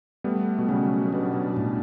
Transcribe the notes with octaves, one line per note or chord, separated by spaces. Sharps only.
G3 A3 B3
B2
C#3 F#3
B2 D4
B2
A2